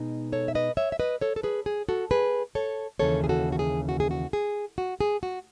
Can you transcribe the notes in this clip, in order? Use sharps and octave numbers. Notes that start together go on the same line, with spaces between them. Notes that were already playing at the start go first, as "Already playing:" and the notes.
Already playing: B2 G#3 D#4
A4 C#5
E5
B4 D#5
C#5 E5
E5
B4 D#5
A4 C#5
A4
G#4 B4
G#4
F#4 A4
G#4 B4
A4 C#5
D#2 C#3 E3 A4 C#5
G#4
F#4 A4
F#4
G#4
F#4
G#4
F#4
G#4
F#4
G#4
F#4